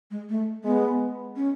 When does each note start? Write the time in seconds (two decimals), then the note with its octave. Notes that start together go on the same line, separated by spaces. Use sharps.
0.11 G#3
0.29 A3
0.64 G#3 B3
1.36 C#4